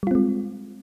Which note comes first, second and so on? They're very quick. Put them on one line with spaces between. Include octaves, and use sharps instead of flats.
G3 F4 C4 G#3